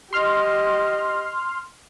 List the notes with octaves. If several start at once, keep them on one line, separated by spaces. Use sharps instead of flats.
G4 D#5 C6 F6